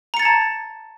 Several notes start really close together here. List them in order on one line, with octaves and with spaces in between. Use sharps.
A#5 C#7 A6 G#6 A5